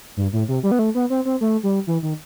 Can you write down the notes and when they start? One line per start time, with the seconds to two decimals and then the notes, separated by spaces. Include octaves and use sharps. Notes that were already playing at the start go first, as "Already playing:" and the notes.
0.17 G2
0.33 A2
0.48 C3
0.63 G3
0.71 B3
0.79 A3
0.95 B3
1.10 C4
1.25 C4
1.41 A3
1.63 G3
1.87 E3
2.03 D#3